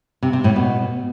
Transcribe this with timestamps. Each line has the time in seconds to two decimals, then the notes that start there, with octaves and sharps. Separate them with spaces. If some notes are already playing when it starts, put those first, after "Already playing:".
0.23 C3
0.33 C3
0.44 A2
0.56 B2